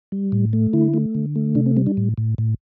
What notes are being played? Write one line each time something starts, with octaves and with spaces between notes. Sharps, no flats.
G3
A2
A3
D3 E4
A3
D3
A3
C3 D4
C4
G3 C4
D4
A2
A2
A2